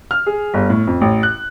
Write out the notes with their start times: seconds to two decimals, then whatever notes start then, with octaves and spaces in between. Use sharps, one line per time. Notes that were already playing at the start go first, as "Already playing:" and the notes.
0.11 F6
0.26 G#4
0.54 G1
0.70 A2
0.87 F2
1.01 A1
1.23 F#6